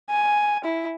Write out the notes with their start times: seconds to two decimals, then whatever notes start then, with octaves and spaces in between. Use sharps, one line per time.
0.10 G#5
0.65 E4